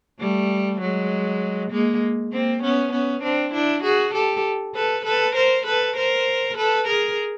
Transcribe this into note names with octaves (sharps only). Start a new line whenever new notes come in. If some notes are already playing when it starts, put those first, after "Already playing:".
G3 A3
F#3 G#3
G#3 A#3
A#3 C4
B3 C#4
B3 C#4
C4 D4
D4 E4
F#4 G#4
G4 A4
A4 B4
A4 B4
A#4 C5
A4 B4
A#4 C5
A4 B4
G#4 A#4